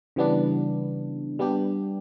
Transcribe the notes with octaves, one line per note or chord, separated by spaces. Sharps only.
C#3 E3 G3 B3 D4
G3 B3 D4 G4